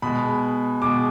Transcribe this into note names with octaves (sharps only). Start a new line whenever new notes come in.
B2 G#3 B5
B2 G#3 D6